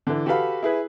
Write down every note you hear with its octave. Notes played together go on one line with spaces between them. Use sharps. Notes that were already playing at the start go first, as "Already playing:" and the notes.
D3 E3
F#4 G4 A4 B4 F5 B5
E4 G#4 B4